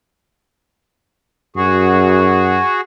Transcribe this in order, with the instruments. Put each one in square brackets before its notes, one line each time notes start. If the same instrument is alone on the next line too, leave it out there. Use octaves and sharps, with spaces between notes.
[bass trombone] F#2 [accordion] F#4 G#4